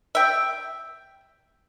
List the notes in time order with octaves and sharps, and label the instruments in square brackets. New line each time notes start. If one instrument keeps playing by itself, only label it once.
[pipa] E5 G5